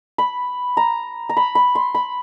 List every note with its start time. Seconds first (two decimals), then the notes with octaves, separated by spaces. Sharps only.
0.18 B5
0.77 A#5
1.29 A#5
1.37 B5
1.55 B5
1.75 C6
1.95 B5